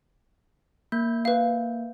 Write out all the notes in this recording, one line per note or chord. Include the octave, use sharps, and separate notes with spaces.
A#3 G6
B4 F5